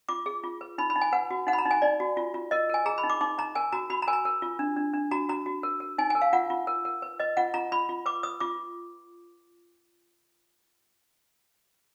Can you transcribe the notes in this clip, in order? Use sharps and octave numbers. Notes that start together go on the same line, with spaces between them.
F4 D6
G#4
F4
B4
D#4 B5
B5
D#4
G#5
B4 F#5
F#4
D#4 F#5
B5
A#5
D#4
G#5
D#4 D5
F#4
F4
F4
A#4 D#5
A#4 G#5
G#4 A#5
B5
D#4
D6
D#4 D6
D#4 A#5
A#4 G#5
F#4 A#5
F#4 B5
A#5
A#4 G#5
A#5
A#4
F4
D4
D4
D4
F#4 A#5
F#4 A#5
F#4
A#4
A#4
D#4 G#5
A#4 G#5
F5
F4 F#5
F4
A#4
A#4
B4
B4 D#5
F4 F#5
F4 A#5
F4 B5
F4
B4 D6
B4 D#6
F4 D6